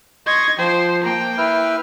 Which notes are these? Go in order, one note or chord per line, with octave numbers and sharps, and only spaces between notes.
D#5 C6 C#6 G#6 A#6
F3 C5 G5
A#3 G5 A#5
E4 B4 E5 F6